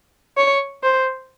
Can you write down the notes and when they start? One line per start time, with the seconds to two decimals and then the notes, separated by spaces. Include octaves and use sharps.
0.37 C#5
0.84 C5